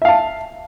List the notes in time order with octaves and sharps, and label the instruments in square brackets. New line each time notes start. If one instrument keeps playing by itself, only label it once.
[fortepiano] E5
F5
A5